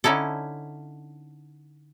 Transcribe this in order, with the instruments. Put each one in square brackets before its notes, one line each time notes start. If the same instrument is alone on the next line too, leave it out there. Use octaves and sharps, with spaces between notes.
[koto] D3 C#4 D#4 E4 A4